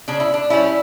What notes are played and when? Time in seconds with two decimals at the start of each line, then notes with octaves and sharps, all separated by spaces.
0.08 C#3 D4
0.20 E4
0.34 D4
0.50 G3 C#4 E4